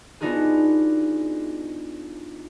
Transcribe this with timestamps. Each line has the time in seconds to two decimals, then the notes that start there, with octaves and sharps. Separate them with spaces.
0.20 B3 D4 D#4 F4 F#4 G#4